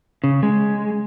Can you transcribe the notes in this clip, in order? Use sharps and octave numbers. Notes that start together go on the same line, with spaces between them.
C#3
G#3